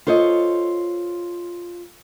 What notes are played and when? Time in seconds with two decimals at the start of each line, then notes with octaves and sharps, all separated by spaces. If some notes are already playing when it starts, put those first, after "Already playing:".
0.07 F4 A4 C5 C#5 D#5